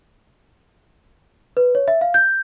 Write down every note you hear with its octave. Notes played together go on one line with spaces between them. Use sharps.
B4
C#5
E5
F5
G6